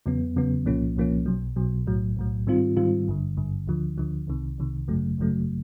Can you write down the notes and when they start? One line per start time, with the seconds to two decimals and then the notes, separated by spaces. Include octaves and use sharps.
0.06 E2 C#3 F#3 B3
0.36 E2 C#3 F#3 B3
0.66 C2 A#2 F3 A#3 C#4
0.96 C2 A#2 F3 A#3 C#4
1.26 B1 B2 F#3
1.56 B1 B2 F#3
1.87 B1 A2 F#3
2.16 B1 A2 F#3
2.47 G#2 D#3 G3 C4 F4
2.76 G#2 D#3 G3 C4 F4
3.08 G#1 G2 D3
3.37 G#1 G2 D3
3.67 D2 D3 F3
3.98 D2 D3 F3
4.27 C2 C3 D#3
4.58 C2 C3 D#3
4.88 G#1 F#2 C#3 F#3 A3
5.18 G#1 F#2 C#3 F#3 A3